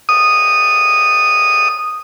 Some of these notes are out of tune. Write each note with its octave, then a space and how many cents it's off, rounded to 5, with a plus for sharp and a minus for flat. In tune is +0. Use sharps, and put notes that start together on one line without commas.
D#6 -10